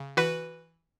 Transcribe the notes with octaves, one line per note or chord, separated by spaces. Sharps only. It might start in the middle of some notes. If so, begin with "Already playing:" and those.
Already playing: C#3
E3 F#4 B4